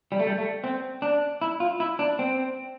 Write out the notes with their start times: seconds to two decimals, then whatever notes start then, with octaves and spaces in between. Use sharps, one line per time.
0.12 G3
0.19 A3
0.27 G3
0.38 A3
0.64 C4
1.02 D4
1.42 E4
1.60 F4
1.80 E4
1.99 D4
2.19 C4